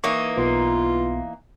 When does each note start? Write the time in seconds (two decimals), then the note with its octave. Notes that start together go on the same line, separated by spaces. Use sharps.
0.04 E3 A#3 D#4 C#6
0.37 B1 B3 F4